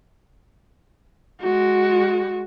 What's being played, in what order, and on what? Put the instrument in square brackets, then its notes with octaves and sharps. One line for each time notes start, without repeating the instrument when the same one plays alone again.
[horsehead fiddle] G#3 F#4